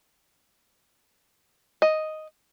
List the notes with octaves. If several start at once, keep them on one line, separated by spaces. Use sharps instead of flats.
D#5